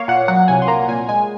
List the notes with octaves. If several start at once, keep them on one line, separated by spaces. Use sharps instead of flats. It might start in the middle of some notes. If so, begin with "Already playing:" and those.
Already playing: A#3 C#5 F5
A#2 F#5
F#3 F#5
C2 G#5
C6
A#3 A#5
A#2 G#5
G#3 G#5